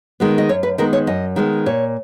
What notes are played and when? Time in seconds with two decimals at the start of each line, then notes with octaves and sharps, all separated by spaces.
0.20 D#3 G#3 B3
0.38 D#5
0.49 F#2 C#5
0.63 B4
0.78 D#3 G#3 B3 A#4
0.93 C#5
1.07 F#2 D#5
1.36 D#3 G#3 B3
1.66 A#2 C#5